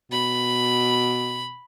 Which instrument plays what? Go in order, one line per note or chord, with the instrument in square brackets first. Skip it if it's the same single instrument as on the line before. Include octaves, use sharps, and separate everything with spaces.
[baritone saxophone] B2 [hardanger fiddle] B5